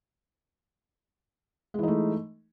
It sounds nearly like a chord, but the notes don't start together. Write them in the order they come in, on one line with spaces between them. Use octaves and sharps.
G#3 E3 D#4 A3